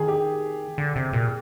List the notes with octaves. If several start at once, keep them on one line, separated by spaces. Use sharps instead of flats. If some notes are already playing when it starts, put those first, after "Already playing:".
Already playing: D#3 G#4
G4
D3
C3
A#2